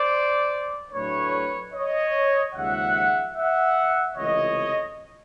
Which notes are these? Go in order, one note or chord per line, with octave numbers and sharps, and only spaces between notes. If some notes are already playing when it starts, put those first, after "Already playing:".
Already playing: C5 D5
A2 F#3 A3 D4 B4 C#5
C#5 D#5
D#2 C#3 F3 G#3 E5 F#5
E5 F#5
C#2 C3 E3 A3 C#5 D#5